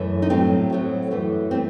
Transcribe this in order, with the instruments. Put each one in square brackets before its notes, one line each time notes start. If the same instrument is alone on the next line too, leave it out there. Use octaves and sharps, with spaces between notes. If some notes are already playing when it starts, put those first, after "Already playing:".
Already playing: [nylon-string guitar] F#2 E3 A3
D#4
A2 F#3 A3 C4
A2 F#3 A3
F#2 E3 A3
E3 A3 C4